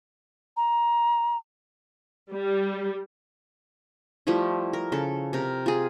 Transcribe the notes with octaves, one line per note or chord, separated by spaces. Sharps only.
A#5
G3
F3 G3 A3 E4
A#4
C#3 A4
C3 A#4
F4 G#4